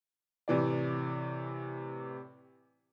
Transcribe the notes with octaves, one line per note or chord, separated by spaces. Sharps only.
A2 C3 E3 D5